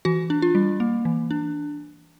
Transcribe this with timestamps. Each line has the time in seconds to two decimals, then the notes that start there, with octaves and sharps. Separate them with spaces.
0.05 E3 F#4
0.30 D4
0.42 F4
0.55 G3
0.80 A#3
1.05 E3
1.31 D4